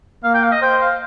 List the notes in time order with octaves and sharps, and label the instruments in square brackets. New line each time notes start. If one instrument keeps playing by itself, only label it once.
[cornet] A#3 [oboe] F5
[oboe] G5
F5
D#5
[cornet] C5 [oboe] G5
[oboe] F5